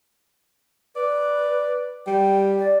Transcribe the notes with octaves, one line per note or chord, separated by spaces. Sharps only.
B4 D5
G3 G5
D5